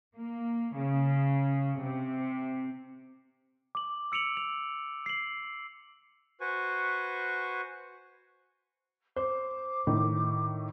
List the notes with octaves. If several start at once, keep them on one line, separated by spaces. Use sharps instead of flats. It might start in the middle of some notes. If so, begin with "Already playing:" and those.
A#3
C#3
C3
D6 F#7
E6 C#7 D7 F7 F#7
F7
C7 F#7
F#4 B4 C5 G#5 C#6
C5 D6
A2 D#3